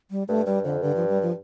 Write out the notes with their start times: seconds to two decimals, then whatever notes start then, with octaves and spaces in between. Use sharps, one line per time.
0.11 G3
0.28 G2 A3
0.46 G2 G3
0.64 F2 D3
0.82 G2 D3
0.96 F3
1.09 G3
1.22 F3